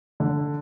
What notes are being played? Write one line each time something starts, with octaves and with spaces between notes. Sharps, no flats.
D3